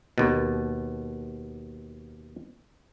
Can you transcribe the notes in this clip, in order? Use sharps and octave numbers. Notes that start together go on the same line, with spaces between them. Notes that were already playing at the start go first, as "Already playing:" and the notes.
D#2 B2